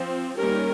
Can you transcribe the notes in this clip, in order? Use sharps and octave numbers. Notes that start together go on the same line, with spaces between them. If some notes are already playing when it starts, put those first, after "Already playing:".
Already playing: F3 C4
D#3 G3 A#3 C#4 G4 A#4